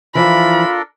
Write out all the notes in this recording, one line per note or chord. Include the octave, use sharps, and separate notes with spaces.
E3 F3 D4 F4 A4 A#4 B5